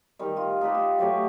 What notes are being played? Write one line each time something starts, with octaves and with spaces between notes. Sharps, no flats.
D#3 G3
F4
D#4 G4 B4 D5
F4
F#3 A3 G4 C#5